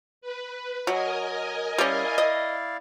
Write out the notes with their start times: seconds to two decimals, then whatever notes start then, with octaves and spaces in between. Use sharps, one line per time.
0.21 B4
0.87 F#3 A#4 D#5 G#5
1.78 G3 C#4 E4 D5 F5
2.18 D#5